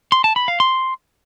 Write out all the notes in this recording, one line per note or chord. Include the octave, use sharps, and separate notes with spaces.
C6
A5
B5
F5
C6